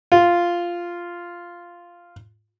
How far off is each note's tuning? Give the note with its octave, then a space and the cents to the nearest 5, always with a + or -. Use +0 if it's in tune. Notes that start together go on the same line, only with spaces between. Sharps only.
F4 -5